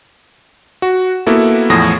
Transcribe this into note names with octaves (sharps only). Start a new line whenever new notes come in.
F#4
A#3 B3 E4 F#4 A4
E2 A2 F3 D#6 A#6